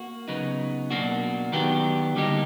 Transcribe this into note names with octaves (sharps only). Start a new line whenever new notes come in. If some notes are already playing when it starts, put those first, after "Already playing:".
Already playing: A#3 F#4
C#3 F#3 B3 D#4
B2 F#3 A#3 D4 F#4
D#3 F#3 B3 D4 G4
D3 G3 A#3 D#4 G4